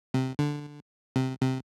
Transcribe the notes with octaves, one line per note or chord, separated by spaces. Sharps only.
C3
D3
C3
C3